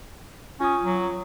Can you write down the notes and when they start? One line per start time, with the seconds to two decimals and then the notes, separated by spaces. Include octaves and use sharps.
0.60 C#4 F4 D#6
0.83 F#3